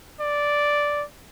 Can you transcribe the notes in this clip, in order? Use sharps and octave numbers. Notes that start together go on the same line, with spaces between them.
D5